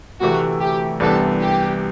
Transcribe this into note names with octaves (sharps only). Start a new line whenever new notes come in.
D2 C3 E3 A3 F#4
G4
C2 C3 E3 B3 D4 A4
G4